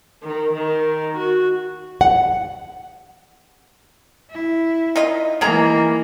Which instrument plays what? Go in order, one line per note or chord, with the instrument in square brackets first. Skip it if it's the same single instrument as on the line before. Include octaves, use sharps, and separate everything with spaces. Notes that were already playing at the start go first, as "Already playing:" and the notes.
[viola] D#3
D#3
F#4
[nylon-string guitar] F#5
[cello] E4
[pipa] D#4 F4 D#5
[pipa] D#3 G#4 A#5 [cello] E3 A#3